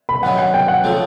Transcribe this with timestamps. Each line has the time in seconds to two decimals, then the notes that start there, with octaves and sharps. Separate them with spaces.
0.09 B5
0.23 F#2 D#3 F#3 F#5
0.39 F#5
0.54 G5
0.68 F#5
0.84 C#3 F3 A3